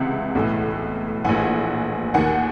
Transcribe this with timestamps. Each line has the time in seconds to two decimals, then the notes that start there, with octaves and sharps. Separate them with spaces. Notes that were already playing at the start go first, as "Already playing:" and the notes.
Already playing: C#2 C3 E3 E5 F#5
0.35 B1 A2 E3
1.24 A#1 A2 E3 F#5 G#5
2.14 D#2 D#3 F#5 G#5